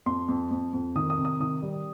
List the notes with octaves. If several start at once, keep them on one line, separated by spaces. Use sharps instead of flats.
F2 C6
F2
F2
F2
D#3 D#6
D#6
C3
D#6
D#3 D#6
G3